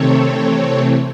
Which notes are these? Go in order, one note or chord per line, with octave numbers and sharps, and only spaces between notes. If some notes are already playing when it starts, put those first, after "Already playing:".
Already playing: C3 D#3 A3 C4 A4 C#5
C3 E3 A3 C4